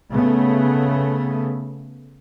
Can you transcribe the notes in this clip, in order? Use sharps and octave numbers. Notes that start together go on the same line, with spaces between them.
C#3 A3 B3